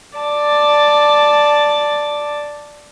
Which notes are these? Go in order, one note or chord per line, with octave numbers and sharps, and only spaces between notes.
D5 A5